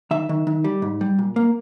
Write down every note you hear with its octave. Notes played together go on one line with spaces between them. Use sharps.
D#3 E5
D#3
D#3
G3
G#2
G3
A#2
A#3